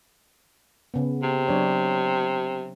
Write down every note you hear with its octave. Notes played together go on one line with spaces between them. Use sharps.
C#3 B3
C3
F#3 D4 C#5